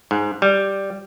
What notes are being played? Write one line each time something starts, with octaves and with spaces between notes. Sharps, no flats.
G#2
G3